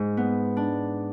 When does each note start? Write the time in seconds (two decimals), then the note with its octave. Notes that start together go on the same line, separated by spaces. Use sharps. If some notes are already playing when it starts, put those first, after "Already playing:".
Already playing: G#2 G#3
0.17 B3
0.57 D4